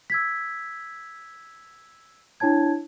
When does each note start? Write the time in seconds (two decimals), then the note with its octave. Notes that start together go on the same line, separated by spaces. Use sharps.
0.10 E6 G#6 B6
2.40 D4 E4 C#5 A5 G#6